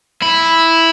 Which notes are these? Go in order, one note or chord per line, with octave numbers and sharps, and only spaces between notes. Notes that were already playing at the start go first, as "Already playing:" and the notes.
E4